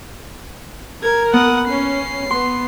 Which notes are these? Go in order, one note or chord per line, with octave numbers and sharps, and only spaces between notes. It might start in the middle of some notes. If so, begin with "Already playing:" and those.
A#4 G#6
B3 F#5 D#6
C#4 C7
B3 C6